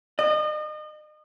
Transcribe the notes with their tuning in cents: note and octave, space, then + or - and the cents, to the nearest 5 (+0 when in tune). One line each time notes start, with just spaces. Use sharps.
D#5 -35